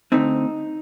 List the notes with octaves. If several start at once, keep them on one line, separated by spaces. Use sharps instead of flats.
D2 D3 A3 C4 D#4